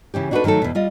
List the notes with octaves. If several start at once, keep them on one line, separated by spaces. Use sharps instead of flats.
C#3 E3 C#4 G4
D4 D#4 F#4 G#4 A4 B4
D#3 F#3 A3 F#4 A4
E2 B2
G3 F4 D#5